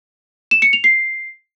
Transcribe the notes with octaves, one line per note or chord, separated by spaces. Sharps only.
E7
C#7
F7
C7